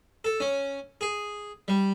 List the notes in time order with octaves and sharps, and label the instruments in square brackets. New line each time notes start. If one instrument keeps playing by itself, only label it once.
[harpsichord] A4
C#4
G#4
G3